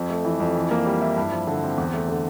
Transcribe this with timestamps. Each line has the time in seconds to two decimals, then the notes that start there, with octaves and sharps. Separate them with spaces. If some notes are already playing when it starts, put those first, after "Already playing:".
Already playing: F2
0.10 A3
0.25 E3
0.40 F2
0.56 E3
0.71 A#3
0.86 G3
1.01 E4
1.17 G2
1.32 F3
1.47 D3
1.62 C4
1.78 E2
1.93 A3
2.08 D3